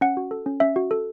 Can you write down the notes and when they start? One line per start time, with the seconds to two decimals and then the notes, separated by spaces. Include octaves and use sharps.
0.01 C#4 F#5
0.17 F#4
0.31 A4
0.46 C#4
0.60 C#4 E5
0.76 F#4
0.91 A4